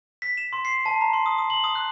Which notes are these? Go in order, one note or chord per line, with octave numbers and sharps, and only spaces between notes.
B6
E7
C6
C7
A5
A#5
C6
D#6
D#6
F#7
D#6
F#6